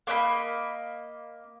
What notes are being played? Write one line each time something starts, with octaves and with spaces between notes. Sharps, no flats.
A#3 D#5 G5 B5